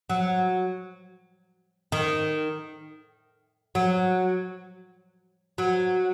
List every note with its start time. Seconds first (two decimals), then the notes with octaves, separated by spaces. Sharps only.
0.10 F#3
1.92 D#3
3.75 F#3
5.58 F#3